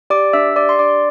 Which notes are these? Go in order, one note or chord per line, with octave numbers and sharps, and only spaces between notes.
G4 D5 D6
D4 E5 E6
G4 D5 D6
C6
D4 D5 D6